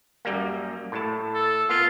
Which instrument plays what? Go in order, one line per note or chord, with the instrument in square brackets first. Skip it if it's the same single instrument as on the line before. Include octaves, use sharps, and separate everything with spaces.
[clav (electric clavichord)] F#2 G3 A#3
A2 A5
[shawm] A4
[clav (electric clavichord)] A#3 B3 [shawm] F4